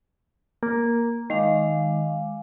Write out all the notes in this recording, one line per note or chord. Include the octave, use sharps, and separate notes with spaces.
A#3
D#3 G#3 F5 D6